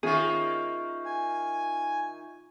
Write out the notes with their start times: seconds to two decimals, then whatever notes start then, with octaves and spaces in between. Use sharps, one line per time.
0.03 D#3 A#3 C#4 F4 G#4 E5 C#6
1.05 G#5